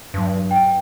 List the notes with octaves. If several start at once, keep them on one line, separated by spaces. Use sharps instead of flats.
E2 G2 F#3
G5